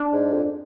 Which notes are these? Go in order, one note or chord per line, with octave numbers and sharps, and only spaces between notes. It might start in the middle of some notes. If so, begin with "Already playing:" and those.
Already playing: D4
G#2
F2